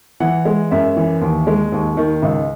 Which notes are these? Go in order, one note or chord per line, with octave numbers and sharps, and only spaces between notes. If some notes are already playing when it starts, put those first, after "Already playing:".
E3 F#5
G#3
F#2 E5
E3
D#2
G#3
D#2
D#3
C#2